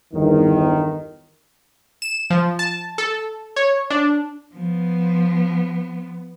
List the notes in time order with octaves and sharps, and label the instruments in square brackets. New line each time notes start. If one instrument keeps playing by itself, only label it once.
[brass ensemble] G1 E2 D#3
[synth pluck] E7
F3
A5
A4
C#5
D4
[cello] F3 B3